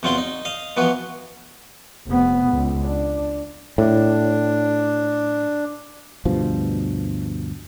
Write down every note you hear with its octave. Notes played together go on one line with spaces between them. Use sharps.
E2 F#3 C4 F4 G5 C6
D#4
D#5 F5
E3 F3 B3 F#4
F1 B3
C#2
D4
A2 D4
D2 G2 B2 F3